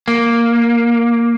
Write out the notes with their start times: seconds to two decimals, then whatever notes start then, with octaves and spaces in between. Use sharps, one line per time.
0.08 A#3